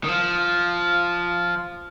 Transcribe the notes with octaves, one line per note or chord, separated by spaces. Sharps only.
D#3
F3